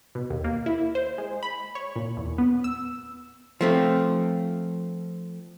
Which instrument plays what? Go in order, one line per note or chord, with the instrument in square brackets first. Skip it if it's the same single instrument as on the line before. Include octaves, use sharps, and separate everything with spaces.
[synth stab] B2
D#2
A#3
E4
C5
G#3
B5
C#5
A#2
E2
B3
E6
[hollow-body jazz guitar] F3 A3 C4